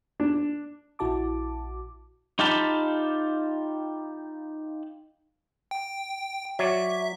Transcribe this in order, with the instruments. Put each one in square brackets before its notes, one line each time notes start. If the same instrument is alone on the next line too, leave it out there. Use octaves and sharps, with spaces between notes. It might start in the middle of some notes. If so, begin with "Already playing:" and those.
[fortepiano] D4
[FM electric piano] A#1 E4 F#4 A5 D6
[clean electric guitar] D#4 F4 G4 F5 A5 B5
[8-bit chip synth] G5
[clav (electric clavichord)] F#3 C#5 D5 [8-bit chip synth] E5